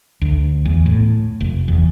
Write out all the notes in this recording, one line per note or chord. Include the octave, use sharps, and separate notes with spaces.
D2
E2
A2
F1
E2